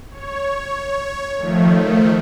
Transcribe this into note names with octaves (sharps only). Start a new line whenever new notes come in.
C#5
D#3 F3 A3